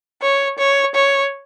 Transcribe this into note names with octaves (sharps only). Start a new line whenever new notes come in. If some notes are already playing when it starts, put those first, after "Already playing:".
C#5
C#5
C#5